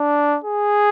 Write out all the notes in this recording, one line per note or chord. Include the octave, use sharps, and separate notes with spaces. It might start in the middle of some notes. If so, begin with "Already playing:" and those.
Already playing: D4
G#4